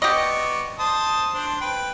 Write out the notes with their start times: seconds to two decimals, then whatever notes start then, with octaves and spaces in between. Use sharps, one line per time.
0.02 B3 G4 D5 D#5 C#6
0.79 C5 A5 D#6
1.34 D4 C5
1.61 B4 G5